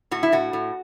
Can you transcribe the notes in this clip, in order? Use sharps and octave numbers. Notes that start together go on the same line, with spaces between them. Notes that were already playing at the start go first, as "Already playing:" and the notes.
A2 F#4
E4
A2 F#4
A2